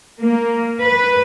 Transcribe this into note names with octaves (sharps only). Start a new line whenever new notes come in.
A#3
B4